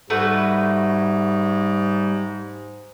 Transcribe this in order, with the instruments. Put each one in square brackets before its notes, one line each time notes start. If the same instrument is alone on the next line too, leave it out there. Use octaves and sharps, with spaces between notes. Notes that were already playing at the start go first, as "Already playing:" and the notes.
[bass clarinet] G#2 [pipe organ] G3 [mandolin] A3 F#4 B4